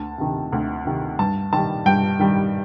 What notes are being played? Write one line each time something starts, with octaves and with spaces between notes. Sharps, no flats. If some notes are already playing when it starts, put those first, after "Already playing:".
Already playing: D2 A5
C3 D#3
D2
C3 D#3
G2 A5
D#3 G3 A5
G2 G5
D#3 G3